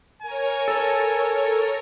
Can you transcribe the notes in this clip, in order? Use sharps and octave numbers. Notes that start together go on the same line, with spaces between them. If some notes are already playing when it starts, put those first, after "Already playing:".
A#4 C#5 G#5
A4